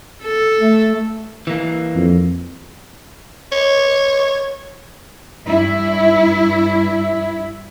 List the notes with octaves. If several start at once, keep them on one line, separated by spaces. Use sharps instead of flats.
A4
A3
E3 A#3
F2
C#5
G2 E4